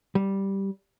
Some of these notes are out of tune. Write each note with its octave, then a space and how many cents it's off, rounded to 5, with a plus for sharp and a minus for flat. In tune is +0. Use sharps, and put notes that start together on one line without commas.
G3 -5